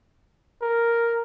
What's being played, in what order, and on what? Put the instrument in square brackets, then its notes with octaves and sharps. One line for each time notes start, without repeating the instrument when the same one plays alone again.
[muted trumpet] A#4